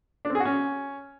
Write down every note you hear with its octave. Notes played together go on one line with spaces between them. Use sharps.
D4
C4
G#4
F#4
C#4